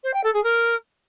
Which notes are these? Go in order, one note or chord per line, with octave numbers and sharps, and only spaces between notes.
C5
G5
A4
G#4
A#4